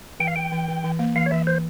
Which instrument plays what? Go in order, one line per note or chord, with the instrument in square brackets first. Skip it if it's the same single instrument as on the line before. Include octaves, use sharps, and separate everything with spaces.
[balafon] E3 [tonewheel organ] G5
[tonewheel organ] F5
[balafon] E3 [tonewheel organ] G5
[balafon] E3
E3
E3
A#3
[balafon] E3 [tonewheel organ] F5
[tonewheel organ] C#5
[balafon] E3 [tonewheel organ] E5
[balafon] E3 [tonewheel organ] C5